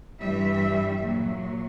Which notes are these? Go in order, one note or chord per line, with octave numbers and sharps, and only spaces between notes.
G2 E3 G3 E5
A#2 F#3